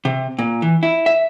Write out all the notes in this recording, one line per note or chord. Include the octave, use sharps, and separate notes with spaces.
C3
A#2
E3
E4
E5